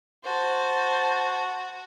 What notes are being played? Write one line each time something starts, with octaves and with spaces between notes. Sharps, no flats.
F#4 C5 A5